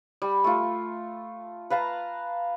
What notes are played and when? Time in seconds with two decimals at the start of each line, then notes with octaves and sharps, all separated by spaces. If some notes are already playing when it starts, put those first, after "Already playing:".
0.22 G3
0.44 A3 F4
1.70 B4 F5 A5 A#5